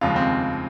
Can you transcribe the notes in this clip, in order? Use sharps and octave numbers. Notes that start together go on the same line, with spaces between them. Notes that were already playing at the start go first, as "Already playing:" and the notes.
F1 D#2 C#3 F3 G#3 F4
C4